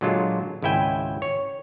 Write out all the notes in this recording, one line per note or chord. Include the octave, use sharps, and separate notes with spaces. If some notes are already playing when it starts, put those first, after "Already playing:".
A#2 D3 F#3 G#3 F4 A4
G#1 C#2 E4 E5 G5 G#5
C#5